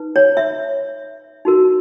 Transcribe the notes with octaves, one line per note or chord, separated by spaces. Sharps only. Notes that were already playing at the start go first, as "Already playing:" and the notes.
Already playing: D#4 B4
C#5
E5
D#4 F#4 A#4